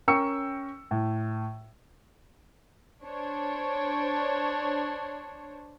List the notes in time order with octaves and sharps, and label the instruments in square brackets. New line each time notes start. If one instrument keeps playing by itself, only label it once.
[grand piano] C#4 A#4 G5 C#6 E6 C#7
A2
[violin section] D4 C5 C#5